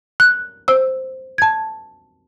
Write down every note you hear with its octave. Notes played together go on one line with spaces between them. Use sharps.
F#6
C5 E6
A5 G#6